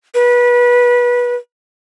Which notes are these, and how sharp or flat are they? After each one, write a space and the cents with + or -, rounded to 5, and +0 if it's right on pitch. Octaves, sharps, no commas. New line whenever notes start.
B4 -25